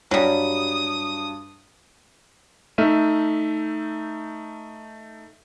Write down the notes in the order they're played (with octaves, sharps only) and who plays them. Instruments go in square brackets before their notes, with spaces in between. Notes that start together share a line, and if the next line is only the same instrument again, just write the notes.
[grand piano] G2 [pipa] F#3 G3 [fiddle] D#6
[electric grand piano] A3 D#4 E5 F6 D#7